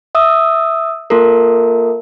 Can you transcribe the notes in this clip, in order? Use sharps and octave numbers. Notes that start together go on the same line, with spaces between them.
E5 D#6 E6
A#3 F4 A4 A#4